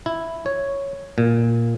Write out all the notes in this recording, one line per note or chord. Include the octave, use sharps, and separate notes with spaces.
E4
C#5
A#2